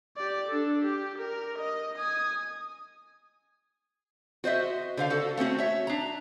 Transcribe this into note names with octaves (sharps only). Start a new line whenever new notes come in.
G4 D5
D4 A4
G4
A#4
D#5
G#5 D#6
F#4 C5 D#5 E5
D3 C5 F5
F#4 A4
A3 C4 C#4 F#4
C#5 E5
D4 A#5